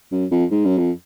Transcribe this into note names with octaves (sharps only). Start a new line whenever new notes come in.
F#2
F2
G#2
F#2
F2